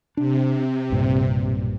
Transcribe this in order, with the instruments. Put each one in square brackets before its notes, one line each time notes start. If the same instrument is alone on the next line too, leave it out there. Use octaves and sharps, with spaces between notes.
[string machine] C3 [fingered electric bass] D4
[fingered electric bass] B1 G2 A#2